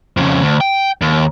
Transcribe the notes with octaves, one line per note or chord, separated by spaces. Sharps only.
F2 C#3
D2
G5
D#2